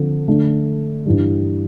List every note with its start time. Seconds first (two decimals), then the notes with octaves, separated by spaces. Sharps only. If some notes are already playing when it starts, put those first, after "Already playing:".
Already playing: D3 F3 C4 F4
0.28 D3 A3 D4
1.06 G2 E3 G3